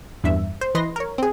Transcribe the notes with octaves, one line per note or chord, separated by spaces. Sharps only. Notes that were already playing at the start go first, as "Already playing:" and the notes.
E2 G2 E5
C5
E3 B4 D#5 C6 A#6
A#4 C#5
C4 G#4